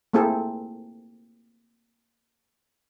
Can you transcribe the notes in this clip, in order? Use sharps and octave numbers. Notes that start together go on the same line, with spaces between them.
A3 A#3 C4 E4 G#4 A4